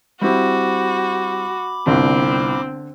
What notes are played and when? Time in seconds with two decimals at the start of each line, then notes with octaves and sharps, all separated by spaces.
0.21 G3 C4 E4 F#4 B5 D6
1.87 G1 C2 D3 C4